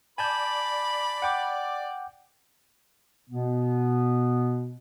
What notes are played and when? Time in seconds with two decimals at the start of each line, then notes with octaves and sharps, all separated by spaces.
0.18 D5 G#5 A5 B5 G6
1.22 F#5 G5 D6
3.30 B2 B3